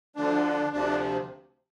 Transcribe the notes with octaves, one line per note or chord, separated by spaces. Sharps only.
D2 D3 F3 D4
D2 C3 F3 D4